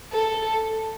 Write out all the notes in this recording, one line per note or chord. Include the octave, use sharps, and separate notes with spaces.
A4